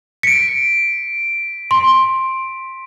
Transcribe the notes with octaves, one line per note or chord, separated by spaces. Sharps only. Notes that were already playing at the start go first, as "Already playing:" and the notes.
B6 C#7 D7
C6